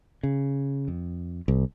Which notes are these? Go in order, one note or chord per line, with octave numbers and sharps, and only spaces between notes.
C#3
F2
C2